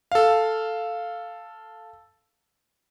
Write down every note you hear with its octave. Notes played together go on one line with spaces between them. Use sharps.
A4 F5